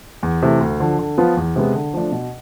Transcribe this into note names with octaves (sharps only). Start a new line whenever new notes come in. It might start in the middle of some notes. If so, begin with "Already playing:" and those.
E2
C3 E3 A3
D2
D3 F3
D3
F3 B3 F4
E2
C3 G#3 B3
D3
F3 A3 D4
B2